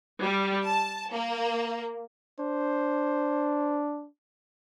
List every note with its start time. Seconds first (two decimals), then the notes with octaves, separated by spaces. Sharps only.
0.21 G3
0.66 A5
1.13 A#3
2.40 D4 C5